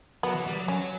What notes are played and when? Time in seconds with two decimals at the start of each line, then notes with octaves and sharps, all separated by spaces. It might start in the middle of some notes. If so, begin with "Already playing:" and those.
0.23 F#3 B3
0.35 E3
0.47 G3
0.58 F#3
0.68 F#3 C#4